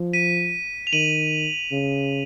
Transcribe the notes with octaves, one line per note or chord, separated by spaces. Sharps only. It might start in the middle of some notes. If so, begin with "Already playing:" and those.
Already playing: F3
B6 D#7
F7
D#3 D#7 F#7
C#3